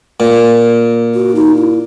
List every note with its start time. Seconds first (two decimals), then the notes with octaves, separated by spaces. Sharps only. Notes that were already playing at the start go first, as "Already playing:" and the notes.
0.20 A#2
1.15 F#4
1.35 D#4
1.56 E4